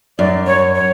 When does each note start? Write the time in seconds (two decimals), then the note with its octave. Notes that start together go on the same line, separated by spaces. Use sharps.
0.18 F#2 D5
0.47 C#5
0.75 C#5